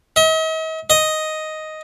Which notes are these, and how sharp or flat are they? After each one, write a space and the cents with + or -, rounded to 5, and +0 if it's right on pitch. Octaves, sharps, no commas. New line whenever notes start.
D#5 +45
D#5 +5